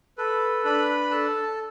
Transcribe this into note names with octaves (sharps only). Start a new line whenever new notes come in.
A4 B4
D4 B4 B5
A4 A5